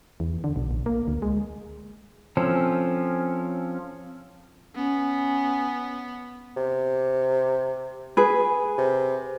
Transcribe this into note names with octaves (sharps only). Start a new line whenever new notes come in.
E2
D3
B1
A#1
A#3
D2
G#3
F3 C4 C#4 A4
B3 C#4
C3
G#4 B4
C3